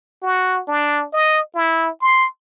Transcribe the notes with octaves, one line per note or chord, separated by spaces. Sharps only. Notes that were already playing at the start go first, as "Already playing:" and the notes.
F#4
D4
D#5
E4
C6